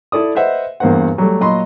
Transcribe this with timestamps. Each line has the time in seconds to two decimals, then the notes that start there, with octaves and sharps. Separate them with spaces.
0.12 E4 A4 D5 D#6
0.35 B4 C5 D#5 E5 F#5
0.80 E2 G2 A#3 C5 F#5
1.18 F#3 G3 A3
1.41 A#2 F#3 D#5 B5 C6